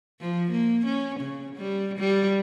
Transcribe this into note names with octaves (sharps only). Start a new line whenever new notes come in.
F3
A#3
C#4
C#3
G3
G3